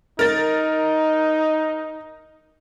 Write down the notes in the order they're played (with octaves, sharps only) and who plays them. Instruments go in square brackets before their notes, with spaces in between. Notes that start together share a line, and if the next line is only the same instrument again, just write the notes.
[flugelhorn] D#4 [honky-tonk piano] A#4 A6